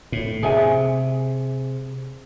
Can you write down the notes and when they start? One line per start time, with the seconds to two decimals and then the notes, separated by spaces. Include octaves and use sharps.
0.12 A2
0.43 C3 G#4 E5 G#5